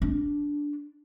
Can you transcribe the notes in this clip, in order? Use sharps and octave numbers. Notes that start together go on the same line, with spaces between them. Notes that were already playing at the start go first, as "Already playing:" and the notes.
D4